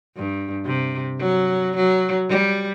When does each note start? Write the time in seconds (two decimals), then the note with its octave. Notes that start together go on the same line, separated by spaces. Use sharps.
0.17 G2
0.65 C3
1.19 F#3
1.76 F#3
2.29 G3